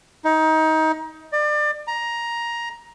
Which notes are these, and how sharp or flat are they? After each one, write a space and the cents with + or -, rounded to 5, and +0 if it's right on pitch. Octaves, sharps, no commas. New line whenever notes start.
D#4 +25
D5 +30
A#5 +10